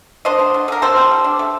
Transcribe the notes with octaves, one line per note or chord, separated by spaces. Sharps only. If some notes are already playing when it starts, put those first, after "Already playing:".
D4 C5 D#5
D3
D3
D3 A#4
G3 A4 C5
G3
G3
D4
A3